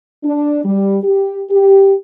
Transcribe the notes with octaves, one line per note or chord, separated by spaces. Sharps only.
D4
G3
G4
G4